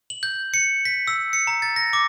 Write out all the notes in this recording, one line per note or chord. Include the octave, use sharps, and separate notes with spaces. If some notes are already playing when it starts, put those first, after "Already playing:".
F#7
G6
C#7
B6
E6
C#7
A#5
A6
A#6
D6